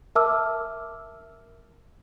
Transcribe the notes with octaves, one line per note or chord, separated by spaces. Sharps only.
A#4 E5 A5 D6 E6 F6